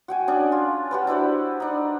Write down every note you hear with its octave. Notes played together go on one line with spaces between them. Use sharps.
F#4 G5 G#5
C#4 D4 G#4
F4
F#4 G4 B4
D4 E4 B4 C5
D4 D#4